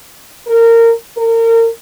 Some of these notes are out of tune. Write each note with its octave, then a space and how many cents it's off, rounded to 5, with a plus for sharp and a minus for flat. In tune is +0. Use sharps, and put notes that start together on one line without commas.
A#4 -20
A#4 -30